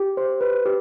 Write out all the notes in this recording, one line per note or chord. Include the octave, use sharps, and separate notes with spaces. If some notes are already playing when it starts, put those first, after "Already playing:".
Already playing: G4
C5
B4
G4